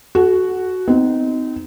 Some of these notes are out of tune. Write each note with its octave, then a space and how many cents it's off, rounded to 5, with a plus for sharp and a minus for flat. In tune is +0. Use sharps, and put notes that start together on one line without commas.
F#4 +0 A4 -45
C4 -30 D#4 +5